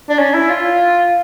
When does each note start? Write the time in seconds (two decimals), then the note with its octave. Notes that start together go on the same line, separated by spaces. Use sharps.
0.09 D4
0.19 C#4
0.34 E4
0.49 F4